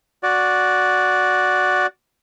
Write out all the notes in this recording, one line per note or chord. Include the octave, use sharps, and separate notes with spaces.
F#4 D5